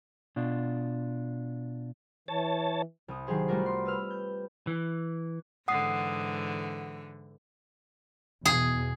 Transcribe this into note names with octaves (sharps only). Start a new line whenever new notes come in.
B2 D4 F4
E3 C#5 A5
C2 D#6
D#3 F#3 G4 G#4 C5
G3 A3 F4 F#4 A#4 D5
C6
B4 E6 F6
G6
E3
G#2 D3 E3 F#5 D#6 C7
E2 B2 G#4